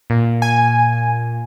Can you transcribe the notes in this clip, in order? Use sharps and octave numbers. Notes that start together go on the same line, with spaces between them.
A#2
G#5